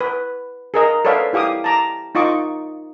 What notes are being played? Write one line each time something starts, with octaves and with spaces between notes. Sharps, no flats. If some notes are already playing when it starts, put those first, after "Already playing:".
B4
G#4 A#4 D#5 A#5
A4 B4 C#5 D5 E5 F5
E4 G4 F5 D6 D#6
A5 A#5 D6
D#4 F4 D#5 C#6 D6